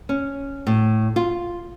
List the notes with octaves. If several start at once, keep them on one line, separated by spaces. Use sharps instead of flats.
C#4
A2
F4